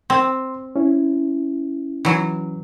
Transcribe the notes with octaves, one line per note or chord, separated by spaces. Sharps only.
C4 C6
C#4 E4
E3 F#3